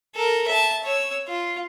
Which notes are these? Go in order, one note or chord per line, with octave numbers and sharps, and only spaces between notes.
A4 A#4
E5 A5
C#5 E6
F4